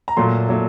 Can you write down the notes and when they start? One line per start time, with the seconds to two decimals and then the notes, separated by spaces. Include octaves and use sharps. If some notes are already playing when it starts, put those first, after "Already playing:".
0.08 A#5
0.17 A#2 F#3 A3 C6
0.49 A#2 F#3 A3